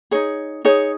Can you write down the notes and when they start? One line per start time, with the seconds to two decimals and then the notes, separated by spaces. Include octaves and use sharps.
0.11 D#4 G#4 C#5
0.65 D#4 G#4 C#5